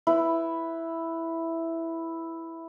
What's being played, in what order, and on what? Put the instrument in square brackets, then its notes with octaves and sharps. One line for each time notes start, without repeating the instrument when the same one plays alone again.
[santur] E4 B4